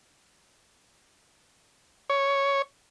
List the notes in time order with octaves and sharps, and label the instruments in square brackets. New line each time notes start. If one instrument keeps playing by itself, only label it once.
[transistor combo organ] C#5